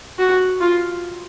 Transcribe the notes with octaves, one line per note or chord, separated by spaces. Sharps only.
F#4
F4